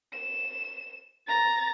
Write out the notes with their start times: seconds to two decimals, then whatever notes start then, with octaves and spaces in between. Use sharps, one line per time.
0.13 E7
1.28 A#5 A6